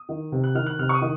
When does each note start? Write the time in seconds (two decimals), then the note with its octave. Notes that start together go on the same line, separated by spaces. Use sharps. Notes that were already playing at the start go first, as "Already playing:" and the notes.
Already playing: D#6
0.09 D#3
0.32 C3
0.44 F#6
0.55 D#3 F6
0.66 F#6
0.79 C3 F6
0.89 C#6
0.95 D#6
1.02 D#3